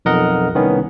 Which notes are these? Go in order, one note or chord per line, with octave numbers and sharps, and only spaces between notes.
B1 F2 A#4 D#5 F#5
C2 D#3 B3 C#4